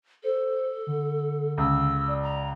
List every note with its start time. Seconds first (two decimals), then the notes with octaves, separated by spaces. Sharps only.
0.24 A4 C5
0.87 D3
1.58 C#2 E6
2.08 D5
2.23 A#5